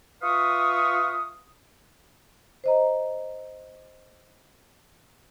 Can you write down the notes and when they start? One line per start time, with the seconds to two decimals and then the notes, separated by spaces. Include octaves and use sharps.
0.22 F4 B4 E5 F5 C#6 D#6
2.64 C5 D#5 A#5